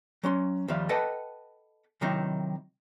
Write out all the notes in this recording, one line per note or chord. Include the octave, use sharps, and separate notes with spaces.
F#3 C#4 C6
D#2 F3 G3 E5 F5
A4 B4 D#5 F#5 G5 A5
C3 D#3 F#3 C4 D#4 E4